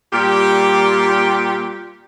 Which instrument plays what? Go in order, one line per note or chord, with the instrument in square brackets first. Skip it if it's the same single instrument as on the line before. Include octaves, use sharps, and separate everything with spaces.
[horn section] A#2 G3 G4